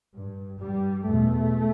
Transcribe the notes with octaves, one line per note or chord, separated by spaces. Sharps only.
G2
G2 G3
E2 B2 A3